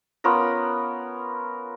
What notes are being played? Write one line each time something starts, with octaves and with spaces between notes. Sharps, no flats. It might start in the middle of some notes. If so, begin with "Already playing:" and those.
B3 C#4 F4 A#4